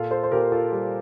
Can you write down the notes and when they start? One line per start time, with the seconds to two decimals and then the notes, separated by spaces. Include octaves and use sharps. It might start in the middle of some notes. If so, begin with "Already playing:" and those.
Already playing: A#2 F4 A4
0.11 A4 C5
0.23 C5
0.31 A#2 G4 A#4
0.52 F4 A4
0.72 G3